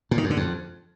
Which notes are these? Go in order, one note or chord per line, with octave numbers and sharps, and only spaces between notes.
A#2
D#3
F#2
D3
F2